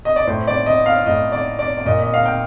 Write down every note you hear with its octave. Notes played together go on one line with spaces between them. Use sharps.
D#5
D5
A2 C5
D5
D#5
F5
A2 D#5
D5
D5
D5
A#2 D#5
D#5
F5
G5